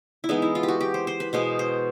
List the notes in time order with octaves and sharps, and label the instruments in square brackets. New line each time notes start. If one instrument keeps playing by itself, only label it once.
[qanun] E4
E3 G#3 B3 D#4
E4
F4
G4
F#4
G4
C5
C5
B4
B2 G#3 B3 C5
C5